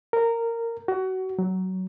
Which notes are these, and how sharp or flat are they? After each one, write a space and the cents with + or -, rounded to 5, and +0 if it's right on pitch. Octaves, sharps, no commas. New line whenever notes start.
A#4 -15
F#4 +25
F#3 +15